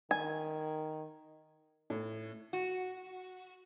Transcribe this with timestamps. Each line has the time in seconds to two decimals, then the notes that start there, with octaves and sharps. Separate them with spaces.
0.11 D#3 G#5
1.90 A2
2.53 F#4